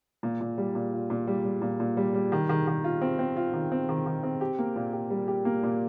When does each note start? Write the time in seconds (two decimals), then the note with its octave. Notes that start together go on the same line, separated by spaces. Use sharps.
0.23 A#2
0.41 A#2
0.58 G3
0.75 A#2
0.93 F4
1.10 A#2
1.27 G3
1.45 G3
1.62 A#2
1.80 A#2
1.97 G3
2.14 G3
2.32 D#3
2.49 D#3
2.67 D#3
2.84 F4
3.02 C4
3.19 C4
3.36 F4
3.53 D#3
3.72 C4
3.89 D#3
4.06 D#3
4.23 C4
4.41 G4
4.59 A#3
4.76 A#2
4.93 G4
5.10 G3
5.28 G4
5.45 A#3
5.63 A#2